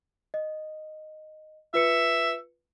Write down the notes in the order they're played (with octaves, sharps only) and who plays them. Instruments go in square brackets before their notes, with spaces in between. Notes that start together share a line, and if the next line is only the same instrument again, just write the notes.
[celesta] D#5
[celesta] F4 B4 C#7 [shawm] E5